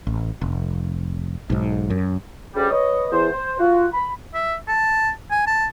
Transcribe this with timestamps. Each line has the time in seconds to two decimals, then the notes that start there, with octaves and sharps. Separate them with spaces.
0.07 A1
0.42 F1
1.50 B1 G#2
1.90 F#2
2.55 D2 C#3 G3
2.70 B4 C#5 D#5
3.11 E2 C5
3.31 C5
3.59 F4 F#4
3.92 B5
4.34 E5
4.68 A5
5.31 G#5
5.47 A5